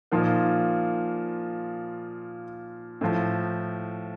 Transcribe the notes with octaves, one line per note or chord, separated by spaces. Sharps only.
A#2 F3 A#3 D#4
A2 F3